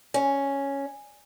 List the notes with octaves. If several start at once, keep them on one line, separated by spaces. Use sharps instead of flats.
C#4